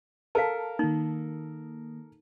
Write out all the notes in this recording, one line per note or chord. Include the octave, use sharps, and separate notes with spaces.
A4 A#4 F5 A5
D#3 A#3 D#4